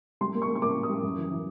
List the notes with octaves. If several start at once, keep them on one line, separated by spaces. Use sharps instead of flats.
G3 C6
A#3
C#6
A#3
C#6
A#3 D6
A#3
D#6
G3
F#2
E3
E3